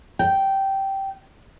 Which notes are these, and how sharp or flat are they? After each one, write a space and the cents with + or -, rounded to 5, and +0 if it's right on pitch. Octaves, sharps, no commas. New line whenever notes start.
G5 -10